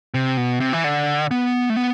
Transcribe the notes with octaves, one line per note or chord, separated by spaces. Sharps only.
C3
B2
C3
E3
D3
B3
A3
B3